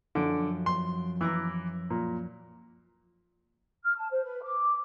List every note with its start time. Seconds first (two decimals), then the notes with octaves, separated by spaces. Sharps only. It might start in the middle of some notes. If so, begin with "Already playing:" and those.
0.15 F#2 D3 F3 D7
0.66 C6
1.21 E3 A#5 D6 G#6
1.90 A#2
3.84 F6
3.97 A5
4.10 C5
4.24 B4
4.43 D6